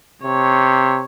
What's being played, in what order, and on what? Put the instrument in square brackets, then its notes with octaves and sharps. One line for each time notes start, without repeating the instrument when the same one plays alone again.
[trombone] C3 [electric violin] C#5